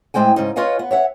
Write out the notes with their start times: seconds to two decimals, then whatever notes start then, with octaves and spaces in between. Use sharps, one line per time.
0.14 A2 G#3 C4 G5 G#5
0.36 G#2 C#3 D#4
0.56 F4 B4 C#5 D#5 F5 G#5
0.79 B3
0.91 C#5 E5 F#5